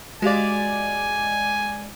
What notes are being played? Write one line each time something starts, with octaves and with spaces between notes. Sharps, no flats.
G#3 F#4 G4 D5 F5 G#5